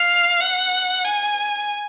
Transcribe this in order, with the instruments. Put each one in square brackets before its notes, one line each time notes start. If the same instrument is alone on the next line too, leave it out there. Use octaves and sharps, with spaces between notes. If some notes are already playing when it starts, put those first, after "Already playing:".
Already playing: [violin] F5
F#5
G#5